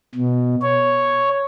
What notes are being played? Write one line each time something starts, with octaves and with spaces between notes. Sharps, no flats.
B2
C#5